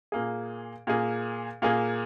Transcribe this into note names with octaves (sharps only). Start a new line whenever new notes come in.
A#2 A#3 G#4
A#2 A#3 G#4
A#2 A#3 G#4